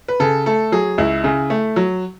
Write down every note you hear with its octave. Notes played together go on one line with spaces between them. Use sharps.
B4
C#3 A4
A3 A4
F#3 G#4
C#2 E4
C#3
A3
F#3